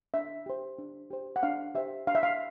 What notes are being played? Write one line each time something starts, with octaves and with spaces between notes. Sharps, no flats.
D4 E5
G4 C5
D4
G4 C5
F#5
D4 F5
G4 C5 E5
D4 F5
E5
F5